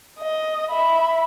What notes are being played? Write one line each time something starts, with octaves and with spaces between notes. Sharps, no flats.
D#5
E5 B5